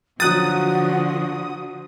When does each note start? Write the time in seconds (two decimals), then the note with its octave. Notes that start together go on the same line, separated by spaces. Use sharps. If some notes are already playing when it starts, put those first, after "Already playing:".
0.20 D3 F3 F#3 F#4 D#6 F#6 A6